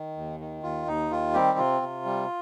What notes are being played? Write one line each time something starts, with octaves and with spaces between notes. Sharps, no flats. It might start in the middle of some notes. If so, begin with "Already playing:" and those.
Already playing: D#3
D#2
D#3
D#2 F4
D#2 D#4
D#3 F4
G3 C4 G4
C3 F4
C3
G3